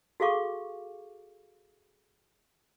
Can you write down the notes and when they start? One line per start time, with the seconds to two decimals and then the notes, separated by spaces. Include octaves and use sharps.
0.20 F#4 G#4 A4 F5 C#6 D6